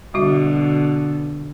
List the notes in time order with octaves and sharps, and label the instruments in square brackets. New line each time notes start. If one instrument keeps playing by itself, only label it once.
[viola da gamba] B2 D3 [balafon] G3 F#4 E5